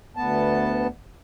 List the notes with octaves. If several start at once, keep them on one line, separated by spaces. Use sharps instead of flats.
D2 B3 A5